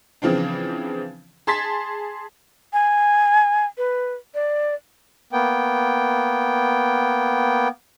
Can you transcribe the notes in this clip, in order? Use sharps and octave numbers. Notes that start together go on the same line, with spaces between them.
C#3 E3 F3 C4 D4
G#4 A5 C6 G#6 A6 B6
G#5
B4
D5
A#3 B3 G5